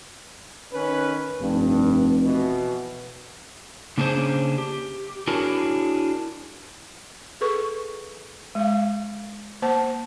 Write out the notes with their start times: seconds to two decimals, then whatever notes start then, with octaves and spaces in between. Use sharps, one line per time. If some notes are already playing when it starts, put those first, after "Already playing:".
0.74 D#3 C#4 B4
1.41 F1 G2
2.24 B2 E3
3.98 C#3 A#3 C#4 D4 G#4 C5
4.58 G4
5.27 D4 E4 F#4 G#4 A#4 C#5
7.41 G#4 A4 B4 C#6
8.55 G#3 F5
9.62 A#3 C5 A5